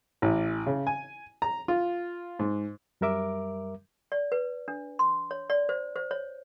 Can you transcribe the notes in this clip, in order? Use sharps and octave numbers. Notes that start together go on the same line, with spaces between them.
A1
C#3
G#5
A#5
F4
G#2
F#2 G3 A#4 E5 D6
D5
B4
D4
C6
C#5
D5
C5
C5
C#5